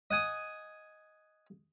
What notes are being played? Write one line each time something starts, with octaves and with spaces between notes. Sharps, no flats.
D#5 F#5 G#5 D#6